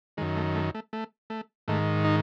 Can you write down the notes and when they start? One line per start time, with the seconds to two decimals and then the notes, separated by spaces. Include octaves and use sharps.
0.17 F#2 D#3 G#3
0.37 A3
0.55 A3
0.75 A3
0.93 A3
1.30 A3
1.68 G#2 D#3 A3
2.05 D#4